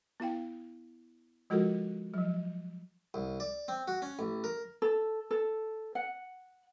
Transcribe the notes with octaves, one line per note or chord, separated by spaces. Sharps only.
B3 E4 F5 G5
F3 G#3 F4 F#4 A4 A#4
F3 F#3
C2
D5
C4
F#4
C#4
A1
A#4
A4
A4
F#5